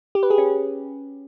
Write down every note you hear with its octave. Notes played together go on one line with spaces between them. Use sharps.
G4
B4
G#4
C#4